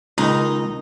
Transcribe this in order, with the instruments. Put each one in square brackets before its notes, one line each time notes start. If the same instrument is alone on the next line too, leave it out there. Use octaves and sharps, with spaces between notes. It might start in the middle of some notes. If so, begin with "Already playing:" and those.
[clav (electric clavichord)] C#2 D#3 [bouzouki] D#4